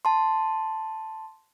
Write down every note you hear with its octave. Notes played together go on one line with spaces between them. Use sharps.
A5 C6